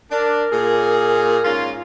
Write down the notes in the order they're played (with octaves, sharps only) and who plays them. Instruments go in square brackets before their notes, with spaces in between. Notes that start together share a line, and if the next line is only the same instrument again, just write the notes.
[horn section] D4 [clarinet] A#4
[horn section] A#2 G#4
G#2 C#4 F4